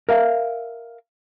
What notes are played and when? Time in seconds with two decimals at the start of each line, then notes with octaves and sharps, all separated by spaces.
0.09 A#4 E5 F5